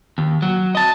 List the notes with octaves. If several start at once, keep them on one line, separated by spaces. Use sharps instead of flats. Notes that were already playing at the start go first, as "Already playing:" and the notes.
D#2
F#3
D#5 A5